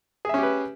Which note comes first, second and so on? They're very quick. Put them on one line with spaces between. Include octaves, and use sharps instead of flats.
G#4 E5 C#4 G4 B4